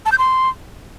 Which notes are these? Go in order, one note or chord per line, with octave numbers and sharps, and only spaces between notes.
A5
G6
C6